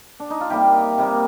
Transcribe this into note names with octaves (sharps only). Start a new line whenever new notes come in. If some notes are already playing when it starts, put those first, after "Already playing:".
D4
D#4
F4
C3 G3 A#3 G4
C3 G3 A#3